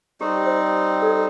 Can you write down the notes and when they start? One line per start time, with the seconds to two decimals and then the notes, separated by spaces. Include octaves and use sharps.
0.21 G3 C4 D#4 G4
0.44 C5
1.02 A4 D5